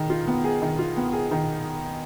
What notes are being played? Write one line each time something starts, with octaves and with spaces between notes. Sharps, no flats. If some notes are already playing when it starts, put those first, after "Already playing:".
Already playing: D#3 G#4
F4
B3
G#4
D#3
F4
B3
G#4
D#3